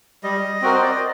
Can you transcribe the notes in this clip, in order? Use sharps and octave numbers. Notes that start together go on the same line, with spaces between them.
G3 D#5
C4 F#4 A#4
C5
D5
D#5